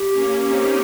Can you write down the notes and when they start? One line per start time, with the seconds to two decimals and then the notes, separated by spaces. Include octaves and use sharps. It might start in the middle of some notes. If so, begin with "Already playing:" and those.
Already playing: G4
0.14 A#3 C#4
0.46 C4 D#4